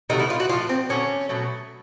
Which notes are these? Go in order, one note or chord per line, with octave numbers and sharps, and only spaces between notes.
C3 D#3 F#3 A3 D#4
E4
F4
F#4
A2 F3 A3 F4
C4
D3 F#3 A3 C#4
B2 F#3 A3